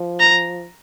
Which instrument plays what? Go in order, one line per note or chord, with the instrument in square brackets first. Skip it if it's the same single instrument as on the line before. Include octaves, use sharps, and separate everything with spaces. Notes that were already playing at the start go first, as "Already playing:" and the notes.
Already playing: [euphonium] F3
[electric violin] A#5